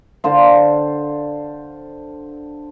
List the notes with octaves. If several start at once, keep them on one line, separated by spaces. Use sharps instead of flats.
D3 C5 F5